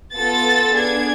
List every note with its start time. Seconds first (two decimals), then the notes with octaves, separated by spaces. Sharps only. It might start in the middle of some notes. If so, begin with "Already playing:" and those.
0.15 B3 F4 A4 A6
0.76 B3 D4 G#4 G#6